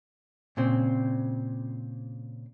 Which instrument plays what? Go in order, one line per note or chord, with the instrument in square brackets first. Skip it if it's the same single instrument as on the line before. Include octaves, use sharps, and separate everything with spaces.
[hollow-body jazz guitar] A#2 C#3 C4